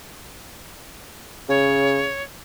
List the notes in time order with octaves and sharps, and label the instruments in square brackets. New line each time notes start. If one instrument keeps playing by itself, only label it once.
[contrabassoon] C#3 [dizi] C#5